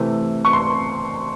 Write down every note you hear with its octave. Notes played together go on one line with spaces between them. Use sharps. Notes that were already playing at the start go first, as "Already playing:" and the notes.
Already playing: C3 E3 A3 C4
C#6
C6